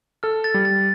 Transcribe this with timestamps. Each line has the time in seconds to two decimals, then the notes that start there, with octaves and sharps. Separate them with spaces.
0.23 A4 F6
0.44 A6
0.54 G3
0.65 A6